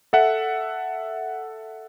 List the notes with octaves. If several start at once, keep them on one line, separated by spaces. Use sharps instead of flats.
A4 E5 F#5